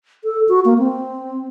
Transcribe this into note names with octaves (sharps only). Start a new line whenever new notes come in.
A4
F#4
A#3
C4